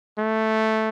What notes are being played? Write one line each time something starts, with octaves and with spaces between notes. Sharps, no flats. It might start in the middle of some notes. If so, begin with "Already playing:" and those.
A3